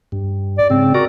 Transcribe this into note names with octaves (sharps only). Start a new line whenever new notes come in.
G2
D5
G#2 C#3 C4
F#4 A#4 D5